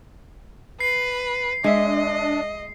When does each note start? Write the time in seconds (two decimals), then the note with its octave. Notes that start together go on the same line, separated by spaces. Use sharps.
0.80 B4 C7
1.64 G#3 D4 D#5 E5